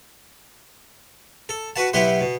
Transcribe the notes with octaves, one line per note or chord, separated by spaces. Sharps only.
A4
F#4 B4 F#5 A5
B1 E4 G4 B4 F#5 C6
B2